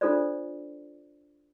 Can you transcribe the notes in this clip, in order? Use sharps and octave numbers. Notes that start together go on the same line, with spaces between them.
D4 F4 A4 C5 D5